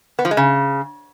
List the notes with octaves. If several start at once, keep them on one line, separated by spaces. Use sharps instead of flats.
B3
F3
G#3
C#3